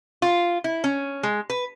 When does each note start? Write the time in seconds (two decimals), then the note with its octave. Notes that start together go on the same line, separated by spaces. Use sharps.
0.22 F4
0.64 E4
0.84 C#4
1.23 G#3
1.50 B4